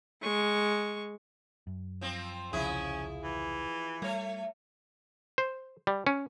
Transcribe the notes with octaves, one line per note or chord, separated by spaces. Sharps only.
G#3 C#6
F#2
F3 C4
E1 C2 C#3 F3 C#4 E4 G#4
E3
G3 A3 C#5
C5
G3
C#4